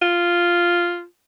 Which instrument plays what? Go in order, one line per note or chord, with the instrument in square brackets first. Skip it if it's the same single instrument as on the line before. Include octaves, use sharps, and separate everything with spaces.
[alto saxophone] F4